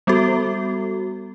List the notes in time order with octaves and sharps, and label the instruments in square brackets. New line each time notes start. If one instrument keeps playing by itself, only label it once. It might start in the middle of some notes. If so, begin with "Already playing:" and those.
[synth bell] G3 B3 F#4 A4